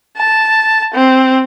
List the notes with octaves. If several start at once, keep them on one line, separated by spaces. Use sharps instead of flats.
A5
C4